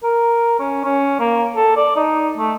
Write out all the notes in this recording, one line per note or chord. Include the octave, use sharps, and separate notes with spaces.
A#4
C#4
C#4
A#3
A4
D5
D#4
A3